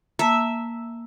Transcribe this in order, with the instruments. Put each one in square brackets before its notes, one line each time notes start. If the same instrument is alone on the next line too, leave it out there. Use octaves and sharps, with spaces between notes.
[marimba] A#3 A5 [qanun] E5